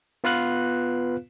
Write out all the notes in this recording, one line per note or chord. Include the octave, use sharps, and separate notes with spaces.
B3 F4 B4 F5 F#6